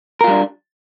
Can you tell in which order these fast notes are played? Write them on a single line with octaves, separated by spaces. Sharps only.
A#4 F4 G3 D4